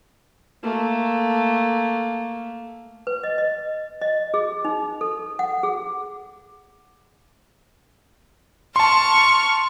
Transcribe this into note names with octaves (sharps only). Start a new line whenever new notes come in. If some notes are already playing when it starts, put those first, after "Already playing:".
A3 A#3
B4
D#5
D#5
D#5
G#4
D#4
A4
F#5
G#4
A5 C6 C#6 F6